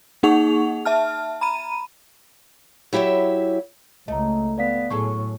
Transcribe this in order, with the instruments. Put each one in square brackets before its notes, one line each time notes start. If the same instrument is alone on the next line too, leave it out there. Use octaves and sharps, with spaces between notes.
[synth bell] A#3 D#4 G#4 F#5 C#6 F7
E5 A5 F6
A#5 B5 D#7
[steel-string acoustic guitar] F#3 E4 G4 C#5 E5
[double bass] C#2 [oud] A3 [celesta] D#5 A#5
[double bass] B3 [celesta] D5 F5 B6
[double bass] A2 [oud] F#3 G#4 A4 [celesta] C#6